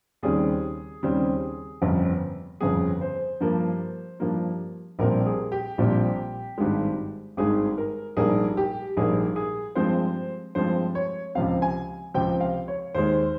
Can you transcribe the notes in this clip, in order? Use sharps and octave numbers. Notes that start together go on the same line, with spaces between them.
D#2 C#3 G3 C4 G#4
D#2 C#3 G3 C4
G1 F2 C#3
G1 F2 C#3 G#4
C5
G2 F3 A#3
G2 F3 A#3
A#1 A#2 G3 C4 A#4
G#4
G4
A#1 A#2 G3 C4
G#1 G2 D#3 G#3
G#1 G2 D#3 G#3 G#4
A#4
A#1 G#2 G3 A#3 G#4
G4
A#1 G#2 G3 A#3 G#4
G#4
G2 F3 G#3 C4 C5
G2 F3 G#3 C4 C5
C#5
C#2 C3 F3 C4 F5
G#5
C#2 C3 F3 C4 G5
F5
C#5
D#2 D#3 G#3 C5